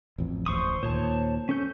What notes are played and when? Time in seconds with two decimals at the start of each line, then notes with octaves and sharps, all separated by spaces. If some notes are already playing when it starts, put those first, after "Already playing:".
0.18 A1 F2
0.46 D1 A1 C5 C#6 D#6
0.83 D#2 A#2 C5 C#5 A5
1.49 C#4 A4 G6